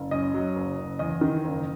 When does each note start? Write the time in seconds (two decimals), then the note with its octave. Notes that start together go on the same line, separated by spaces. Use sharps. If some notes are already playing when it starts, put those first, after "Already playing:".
Already playing: F#1
0.11 F#2 D#5
0.34 F#3
0.56 F#1
0.78 F#1
0.99 E2 D#5
1.21 D#3
1.44 F#1